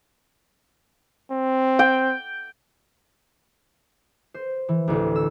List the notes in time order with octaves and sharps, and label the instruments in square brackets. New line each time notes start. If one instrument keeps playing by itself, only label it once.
[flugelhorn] C4
[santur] G5
[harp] C5
E3
A1 D2
E6